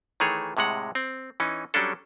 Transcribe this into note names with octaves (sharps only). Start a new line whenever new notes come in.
D#3 E3 A3 G#4 C#5
A2 C3 G#3 F#5
C4
E3 C#4 D#4
F#3 G3 C#4 D4 A4